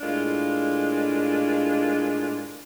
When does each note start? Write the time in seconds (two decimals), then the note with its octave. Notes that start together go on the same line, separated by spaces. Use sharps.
0.01 A2 G#3 A#3 D4 F4